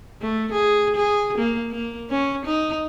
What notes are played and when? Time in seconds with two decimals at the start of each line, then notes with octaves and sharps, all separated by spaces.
0.21 A3
0.52 G#4
0.96 G#4
1.38 A#3
1.71 A#3
2.11 C#4
2.45 D#4